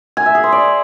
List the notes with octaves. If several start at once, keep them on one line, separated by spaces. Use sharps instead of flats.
G#5
E5
G#4
C5
D5